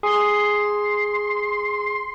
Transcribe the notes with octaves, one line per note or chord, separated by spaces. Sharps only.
G#4 C6